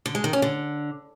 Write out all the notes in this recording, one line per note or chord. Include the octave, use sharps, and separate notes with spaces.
D3
G#3
D#3
C#4
D3